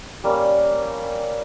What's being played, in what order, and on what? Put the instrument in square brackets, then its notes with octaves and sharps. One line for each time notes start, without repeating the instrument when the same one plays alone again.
[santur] G3 A#3 C#4